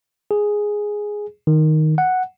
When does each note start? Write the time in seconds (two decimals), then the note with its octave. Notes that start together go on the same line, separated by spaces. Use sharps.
0.31 G#4
1.47 D#3
1.98 F#5